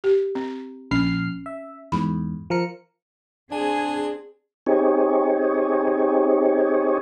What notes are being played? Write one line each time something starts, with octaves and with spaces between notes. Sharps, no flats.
G4
C4
A#1 C#4 F6 C7
E5
E2 G#2 B5
F3 A#4 C#7
C4 D4 G#4 G#5
C4 D#4 G4 G#4 C#5